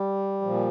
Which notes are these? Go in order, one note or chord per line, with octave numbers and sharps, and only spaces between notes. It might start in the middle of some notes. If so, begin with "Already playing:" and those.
Already playing: G3
A#2 F3